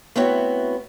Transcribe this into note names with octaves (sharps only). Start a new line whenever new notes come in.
A3 B3 C4 E4 F#4 C#5